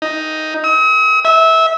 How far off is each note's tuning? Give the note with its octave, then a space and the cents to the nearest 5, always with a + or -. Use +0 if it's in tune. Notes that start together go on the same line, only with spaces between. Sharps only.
D#4 +5
D#6 +45
E5 -20